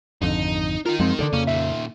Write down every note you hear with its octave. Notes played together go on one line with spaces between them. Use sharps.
G#1 F2 D3 D#4
D#4 F4 A#4
F#2 F3 G#3 C4
D2 D3 A4 D5
F2 C#3 A#3 C#4
A#2 D#3 E5